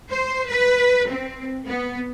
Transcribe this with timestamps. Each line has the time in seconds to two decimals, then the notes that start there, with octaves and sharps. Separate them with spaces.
0.11 C5
0.49 B4
1.10 C4
1.66 B3